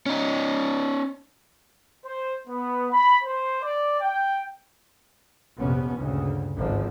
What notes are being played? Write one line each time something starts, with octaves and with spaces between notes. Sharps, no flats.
C#4 D#4
C5
B3
B5
C5
D5
G5
A#1 F2 C3 B3 C#4
D2 G2 A#2 C#3
G#1 C#2 G#2 D3 F3